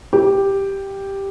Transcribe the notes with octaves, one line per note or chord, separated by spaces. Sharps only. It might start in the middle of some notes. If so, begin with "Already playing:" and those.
G4